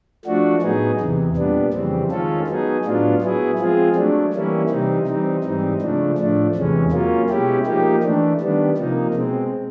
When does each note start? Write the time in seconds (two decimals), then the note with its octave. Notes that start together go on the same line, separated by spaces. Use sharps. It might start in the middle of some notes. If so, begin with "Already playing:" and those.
0.25 F3 A3 D4 F#4
0.62 A2 F#3 B3 D#4 G#4
1.00 E2 C3 E3
1.36 A#2 G3 B3 D4
1.73 F2 C#3 E3 G3 C4
2.10 D#3 G#3 C#4 F4 A4
2.48 F#3 B3 D#4 G#4
2.85 A2 F#3 B3 D4 F4
3.22 F#3 B3 E4 G#4
3.59 F3 G#3 C4 F4 G#4
3.96 F#3 A3 D4
4.33 E3 G3 A#3 C#4 E4
4.69 C3 E3 G3 C4 D#4
5.07 E3 G3 C4 D#4
5.44 G#2 E3 G3 C4 D#4
5.81 C#3 F3 A3 D4
6.18 A2 F3 A3 D4
6.55 E2 C3 E3 G#3 C#4
6.92 F#3 A#3 C#4 F4
7.29 B2 G#3 C#4 E4 G4
7.66 F3 A#3 D#4 G4
8.03 E3 A3 D4
8.40 D#3 G3 B3 D4
8.78 C3 F3 A#3 D#4
9.14 B2 G#3 C4